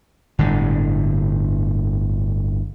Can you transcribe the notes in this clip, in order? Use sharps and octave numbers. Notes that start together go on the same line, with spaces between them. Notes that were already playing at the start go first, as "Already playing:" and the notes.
G1 A2 D3